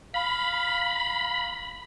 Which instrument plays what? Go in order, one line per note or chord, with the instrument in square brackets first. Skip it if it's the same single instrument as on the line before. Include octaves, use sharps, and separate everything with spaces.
[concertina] F5 [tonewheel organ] B5